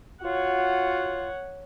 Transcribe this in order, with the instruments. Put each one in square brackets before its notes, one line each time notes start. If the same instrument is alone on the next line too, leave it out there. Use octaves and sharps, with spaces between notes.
[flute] F4 [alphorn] F#4 [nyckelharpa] C#5 F#5